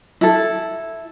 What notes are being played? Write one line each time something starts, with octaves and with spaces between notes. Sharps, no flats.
E4 A4